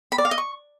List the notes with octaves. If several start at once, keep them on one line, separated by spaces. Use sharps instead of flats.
B5
D5
F5
D#5
C#6